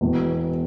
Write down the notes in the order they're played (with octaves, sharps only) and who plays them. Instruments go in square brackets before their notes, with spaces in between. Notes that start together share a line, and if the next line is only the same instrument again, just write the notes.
[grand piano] E1 E2 B2